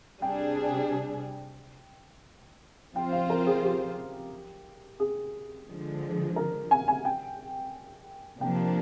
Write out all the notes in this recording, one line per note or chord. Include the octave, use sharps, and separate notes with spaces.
C3 G3 D4 G#4 G5
F3 C4 F4 C5 G5
F5
A#4
G#4
G4
G#4
D3 F3 G#3
A#4
G#5
G#5
G5
C3 F3 A#3 D4 G5